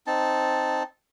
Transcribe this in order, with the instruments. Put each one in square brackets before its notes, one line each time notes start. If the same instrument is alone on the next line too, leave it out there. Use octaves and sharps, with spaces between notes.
[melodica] C4 D#4 A5